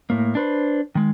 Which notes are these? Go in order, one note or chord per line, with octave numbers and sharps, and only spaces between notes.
A2 A#3
D4 B4 C5
D#3 G#3